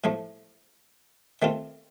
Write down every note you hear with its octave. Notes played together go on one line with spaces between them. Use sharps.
A2 F3 A3
D#3 A3 C4 F4